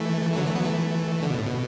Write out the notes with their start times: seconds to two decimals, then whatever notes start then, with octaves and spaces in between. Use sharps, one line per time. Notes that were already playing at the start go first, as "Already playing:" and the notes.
Already playing: E3 A3
0.32 A3
0.36 D3 F#3
0.46 E3 A3
0.55 F#3 B3
0.66 E3 A3
1.23 D3
1.30 B2
1.38 A2
1.46 B2